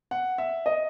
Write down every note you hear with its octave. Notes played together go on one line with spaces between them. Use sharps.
F#5
E5
D#5